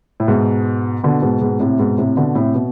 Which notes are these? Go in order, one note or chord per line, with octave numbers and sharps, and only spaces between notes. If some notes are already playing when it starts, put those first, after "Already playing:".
A2
G#2 B2
B2 D3
G#2 B2
G#2 B2
A2 C3
G#2 B2
A2 C3
B2 D3
A2 C3
B2